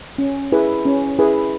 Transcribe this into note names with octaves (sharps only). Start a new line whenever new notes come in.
C#4
E4 G#4 B4
C#4
E4 G#4 B4